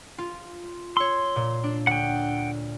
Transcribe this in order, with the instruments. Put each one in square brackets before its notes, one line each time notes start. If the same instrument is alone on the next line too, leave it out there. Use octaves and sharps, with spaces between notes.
[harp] F4
[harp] C#5 E6 [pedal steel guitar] C6
[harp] A#2
D4
[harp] D2 [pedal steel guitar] F#5 G5